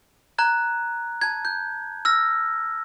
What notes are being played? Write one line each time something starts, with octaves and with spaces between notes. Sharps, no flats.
A#5 F#6 G#6
A5 G#6
G6
E6 F6 A#6